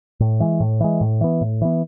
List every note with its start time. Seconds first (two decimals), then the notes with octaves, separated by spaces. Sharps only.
0.20 A2
0.40 E3 G#3
0.60 A2
0.80 E3 G#3
1.01 A2
1.21 E3 B3
1.41 A2
1.61 E3 B3